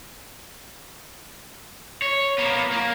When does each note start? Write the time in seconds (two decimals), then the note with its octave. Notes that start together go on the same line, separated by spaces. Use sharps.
2.02 C#5
2.38 A#3 B3
2.72 A#3